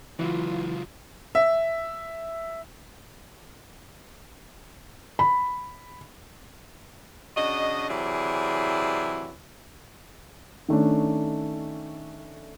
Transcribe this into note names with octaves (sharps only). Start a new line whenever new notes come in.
C#2 E3 F#3 F4
E5
B5
C#3 D4 F#4 D#5
C3 E3 F#3 E4 G#4 D5
D#3 A3 C#4 D4